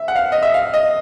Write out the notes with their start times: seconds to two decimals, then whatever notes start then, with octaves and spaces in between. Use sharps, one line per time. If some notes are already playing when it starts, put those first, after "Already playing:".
Already playing: E5
0.08 F#5
0.16 F5
0.32 D#5
0.43 E5
0.54 F5
0.74 D#5